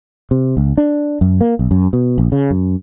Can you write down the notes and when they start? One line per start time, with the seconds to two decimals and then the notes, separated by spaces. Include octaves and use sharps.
0.31 C3
0.57 C#2
0.78 D4
1.21 F#2
1.41 A#3
1.59 B1
1.71 F#2
1.93 B2
2.18 A#1
2.32 C#3
2.51 F#2